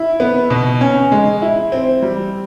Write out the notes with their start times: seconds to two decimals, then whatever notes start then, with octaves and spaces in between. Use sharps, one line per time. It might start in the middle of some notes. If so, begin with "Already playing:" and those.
Already playing: E4
0.20 B3
0.50 B2
0.81 C#4
1.12 G#3
1.42 E4
1.72 C4
2.02 G3